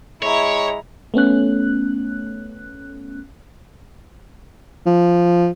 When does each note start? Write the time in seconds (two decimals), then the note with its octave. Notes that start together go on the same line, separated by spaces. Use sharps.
0.23 G#3 E4 C#5 A#5
1.14 A3 B3 C#4 F#6
4.86 F3